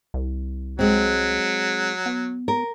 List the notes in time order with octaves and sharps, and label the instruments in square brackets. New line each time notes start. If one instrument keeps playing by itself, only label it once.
[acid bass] C2
[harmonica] F#3 [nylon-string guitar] G#3 C4
[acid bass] B3
[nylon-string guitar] A#4